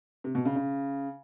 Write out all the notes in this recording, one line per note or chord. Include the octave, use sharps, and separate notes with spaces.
C3
B2
C#3
C#3